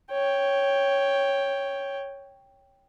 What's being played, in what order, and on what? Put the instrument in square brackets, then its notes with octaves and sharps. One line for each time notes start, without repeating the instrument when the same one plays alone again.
[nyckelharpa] C#5 G5